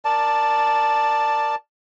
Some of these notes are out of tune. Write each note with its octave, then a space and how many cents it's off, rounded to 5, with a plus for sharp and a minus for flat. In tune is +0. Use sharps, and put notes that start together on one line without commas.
A#4 +0 D5 +10 A5 +0